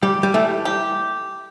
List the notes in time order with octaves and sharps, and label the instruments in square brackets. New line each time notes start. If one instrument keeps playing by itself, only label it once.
[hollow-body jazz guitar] G3 [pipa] G4
[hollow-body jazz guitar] G3
[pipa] E3 [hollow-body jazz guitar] A3
[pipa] G4